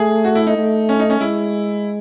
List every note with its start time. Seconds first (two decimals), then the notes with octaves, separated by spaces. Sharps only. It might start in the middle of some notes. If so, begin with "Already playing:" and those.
Already playing: A3 G#4
0.25 F#4
0.35 E4
0.47 D#4
0.57 A3
0.89 C#4
0.99 D#4
1.10 C#4
1.20 G#3 E4